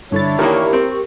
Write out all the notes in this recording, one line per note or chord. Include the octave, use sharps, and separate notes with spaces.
G2 D3 D4 E4 C#5 A6
E2 D#3 A#3 G4 A#4 C#6
C4